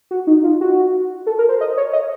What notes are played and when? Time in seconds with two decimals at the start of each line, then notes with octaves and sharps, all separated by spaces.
0.11 F#4
0.27 D#4
0.44 F4
0.61 F#4
1.27 A4
1.39 A#4
1.49 C5
1.61 D#5
1.77 C#5
1.93 D#5